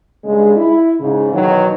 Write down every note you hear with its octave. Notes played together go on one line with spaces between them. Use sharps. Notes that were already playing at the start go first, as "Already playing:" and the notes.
G2 C#3 G#3
E4
G#2 C#3
B2 D#3 E3 F#3